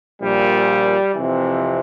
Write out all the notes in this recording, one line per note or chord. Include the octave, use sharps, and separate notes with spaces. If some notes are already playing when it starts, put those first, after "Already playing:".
A#1 A#2 G3
F2 C3 E3